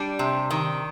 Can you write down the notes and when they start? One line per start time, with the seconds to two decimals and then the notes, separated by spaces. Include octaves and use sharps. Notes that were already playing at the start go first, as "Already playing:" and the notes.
Already playing: G3 D4
0.19 C3
0.50 D#3